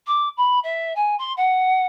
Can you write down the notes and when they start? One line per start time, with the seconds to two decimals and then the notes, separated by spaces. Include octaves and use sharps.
0.07 D6
0.37 B5
0.63 E5
0.95 G#5
1.18 C6
1.37 F#5